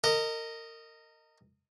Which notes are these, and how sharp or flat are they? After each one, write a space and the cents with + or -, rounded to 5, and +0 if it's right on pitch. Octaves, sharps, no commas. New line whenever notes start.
A#4 -30 D#5 +0